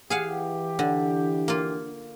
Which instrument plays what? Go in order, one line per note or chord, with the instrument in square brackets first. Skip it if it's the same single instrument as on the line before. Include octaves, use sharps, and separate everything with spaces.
[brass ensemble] E3 G4 [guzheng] G#4 F5 F#5
[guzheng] D3
A#3 F4